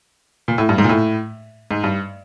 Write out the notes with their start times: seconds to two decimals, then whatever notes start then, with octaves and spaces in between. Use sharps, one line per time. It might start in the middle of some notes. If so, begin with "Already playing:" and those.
0.48 A#2
0.58 A2
0.69 G2
0.78 G#2
0.84 A#2
0.89 A2
1.71 G#2
1.84 G2